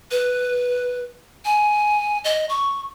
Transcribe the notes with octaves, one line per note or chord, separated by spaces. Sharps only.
B4
G#5
D#5
C#6